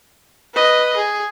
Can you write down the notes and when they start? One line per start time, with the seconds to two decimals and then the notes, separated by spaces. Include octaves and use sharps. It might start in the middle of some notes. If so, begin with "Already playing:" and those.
0.54 B4 D#5
0.96 G#4